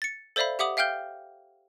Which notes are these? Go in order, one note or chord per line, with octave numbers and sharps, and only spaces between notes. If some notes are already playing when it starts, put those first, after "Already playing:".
A6 C#7
A4 C5 D5 E5 F5 B5
G4 E5 F#5 D6 D#6 F#7
E5 F5 G5 F6 G6 G7